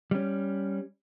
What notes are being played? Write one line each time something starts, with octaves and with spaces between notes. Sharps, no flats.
G3 C#4